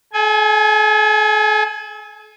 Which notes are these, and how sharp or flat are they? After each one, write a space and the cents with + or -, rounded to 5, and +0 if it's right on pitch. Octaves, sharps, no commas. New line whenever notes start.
A4 -45 G#5 +0